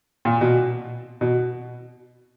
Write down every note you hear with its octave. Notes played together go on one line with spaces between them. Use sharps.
A#2
B2
B2